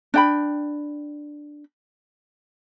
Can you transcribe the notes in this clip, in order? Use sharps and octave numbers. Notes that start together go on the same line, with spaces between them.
D4 G5 B5